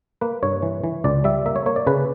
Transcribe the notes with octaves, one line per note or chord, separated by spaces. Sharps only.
A#3 B4
G2 C#5
E3
E3
C#2 D5
G3 E5
A#3 E5
C#5
A#3 C#5
D5
C#3 B4